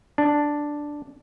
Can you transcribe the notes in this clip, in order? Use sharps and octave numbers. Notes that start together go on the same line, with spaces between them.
D4